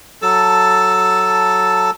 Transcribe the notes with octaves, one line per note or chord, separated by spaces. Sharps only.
F#3 A4 A5